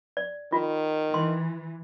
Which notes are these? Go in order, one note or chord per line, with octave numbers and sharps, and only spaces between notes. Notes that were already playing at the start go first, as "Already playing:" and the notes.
D5
D#3 F4 F#4
E3 C6